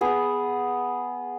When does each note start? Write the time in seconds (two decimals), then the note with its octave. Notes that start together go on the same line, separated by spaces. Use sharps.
0.01 B3 G#4